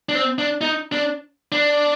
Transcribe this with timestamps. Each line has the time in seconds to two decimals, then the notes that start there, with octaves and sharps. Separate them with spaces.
0.09 D4
0.15 C4
0.38 D4
0.61 D#4
0.92 D4
1.52 D4